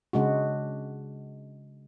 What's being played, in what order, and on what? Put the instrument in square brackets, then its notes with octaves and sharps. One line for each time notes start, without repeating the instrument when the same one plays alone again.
[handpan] C#3 G#3 D4 F#4